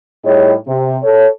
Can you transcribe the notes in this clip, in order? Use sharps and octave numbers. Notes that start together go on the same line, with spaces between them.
A2 G3 D#4 G#4 C#5
C3
A4 C#5